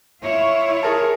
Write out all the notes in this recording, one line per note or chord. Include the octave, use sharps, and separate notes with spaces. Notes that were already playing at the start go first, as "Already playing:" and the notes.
E4 F4 C#5
G#4 A#4 A5